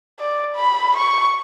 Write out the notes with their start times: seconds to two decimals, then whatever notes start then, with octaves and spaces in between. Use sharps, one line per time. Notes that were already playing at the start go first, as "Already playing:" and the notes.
0.19 D5
0.56 B5
0.96 C#6